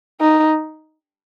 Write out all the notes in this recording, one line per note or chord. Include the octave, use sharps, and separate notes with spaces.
D#4